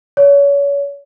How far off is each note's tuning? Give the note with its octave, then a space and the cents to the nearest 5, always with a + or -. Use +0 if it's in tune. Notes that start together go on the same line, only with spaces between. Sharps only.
C#5 +35